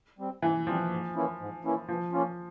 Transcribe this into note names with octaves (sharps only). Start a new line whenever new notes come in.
G3 C4
G#2 E3
F3 G3 C4
G#2
E3 A#3 C#4 E4
G#2
E3 A#3 C#4 E4
E3 F3
A#3 C#4 F4